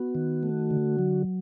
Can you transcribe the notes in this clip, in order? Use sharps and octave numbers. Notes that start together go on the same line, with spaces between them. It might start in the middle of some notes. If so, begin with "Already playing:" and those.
Already playing: B3 F#4
D#3
A3
D3
F#3